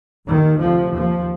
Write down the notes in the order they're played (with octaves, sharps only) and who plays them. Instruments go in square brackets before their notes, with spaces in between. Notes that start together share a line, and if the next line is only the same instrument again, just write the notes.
[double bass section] D#2 D#3
D2 C3 F3
D#2 F3